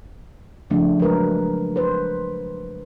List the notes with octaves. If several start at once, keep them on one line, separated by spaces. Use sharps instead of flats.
C#3 F3 A3 D4
F#3 G#3 A#4 B4
B4 C5